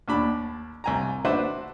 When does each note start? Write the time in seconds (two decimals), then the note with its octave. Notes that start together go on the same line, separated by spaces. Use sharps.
0.08 D#2 D4 B5
0.84 C2 G#5 A#5
1.25 D4 F#4 B4 C5 E5